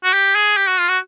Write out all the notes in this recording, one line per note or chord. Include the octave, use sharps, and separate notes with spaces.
F#4
G4
G#4
G4
F#4
F4
F#4